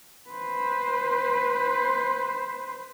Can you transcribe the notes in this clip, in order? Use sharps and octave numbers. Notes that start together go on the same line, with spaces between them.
B4 C5